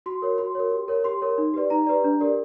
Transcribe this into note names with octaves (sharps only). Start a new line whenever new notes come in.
F#4 C6
A#4 C#5
F#4 C6
A#4 C#5
G4
A#4 C#5
G4 C6
A#4 C#5
D#4
G4 B4 D5
D#4 A#5
G4 B4 D5
D4
G4 A#4 D5